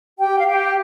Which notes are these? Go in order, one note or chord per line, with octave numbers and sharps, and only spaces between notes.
G4 G5
F5
G4 G5